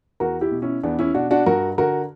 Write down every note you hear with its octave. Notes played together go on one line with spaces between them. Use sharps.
E2 F#4 A#4
E4 G4
B2
C#4 E4
E2 B3 D4
C#4 E4
B2 D4 F#4
D4 F#4
G2 F#4 A#4
D3 F#4 A#4